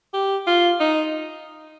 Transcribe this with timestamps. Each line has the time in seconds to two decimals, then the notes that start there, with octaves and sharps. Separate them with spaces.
0.14 G4
0.47 F4
0.80 D#4